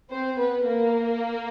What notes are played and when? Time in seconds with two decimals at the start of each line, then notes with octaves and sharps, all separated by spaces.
0.10 C4 C5
0.39 B3 B4
0.67 A#3 A#4